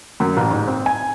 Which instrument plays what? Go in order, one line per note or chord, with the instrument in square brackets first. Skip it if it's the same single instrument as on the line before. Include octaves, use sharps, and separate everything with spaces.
[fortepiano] F#2
A1
G#2
C4
G#5